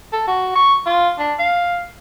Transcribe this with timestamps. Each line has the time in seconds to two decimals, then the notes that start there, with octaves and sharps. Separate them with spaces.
0.12 A4
0.27 F#4
0.55 C#6
0.86 F4
1.18 D4
1.39 F5